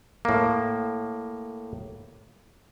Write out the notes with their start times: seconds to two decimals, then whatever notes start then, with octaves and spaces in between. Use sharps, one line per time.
0.25 A2 A#3